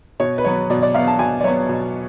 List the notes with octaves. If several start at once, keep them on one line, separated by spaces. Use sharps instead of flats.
B2 C#5
B4
F#3 B3 C#5
B2 D5
D5
F#3 B3 F5
A5
B2 G#5
D5
F#3 B3 C#5
B2